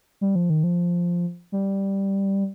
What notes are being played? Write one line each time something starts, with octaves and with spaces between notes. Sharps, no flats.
G3
F3
D#3
F3
G3